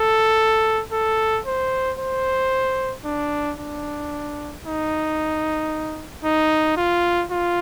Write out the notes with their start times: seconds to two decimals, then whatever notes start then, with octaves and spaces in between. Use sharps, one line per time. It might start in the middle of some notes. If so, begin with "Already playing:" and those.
Already playing: A4
0.93 A4
1.46 C5
1.99 C5
3.05 D4
3.59 D4
4.65 D#4
6.24 D#4
6.77 F4
7.31 F4